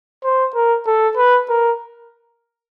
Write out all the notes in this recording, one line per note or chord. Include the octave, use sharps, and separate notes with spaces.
C5
A#4
A4
B4
A#4